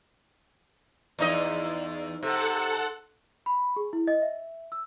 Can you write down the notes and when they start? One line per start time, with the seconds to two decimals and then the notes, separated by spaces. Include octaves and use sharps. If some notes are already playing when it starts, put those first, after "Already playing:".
1.19 E2 D#4 D#5
2.23 C3 A4 F#5
3.46 B5
3.76 G#4
3.93 E4
4.08 D#5
4.22 E5
4.72 E6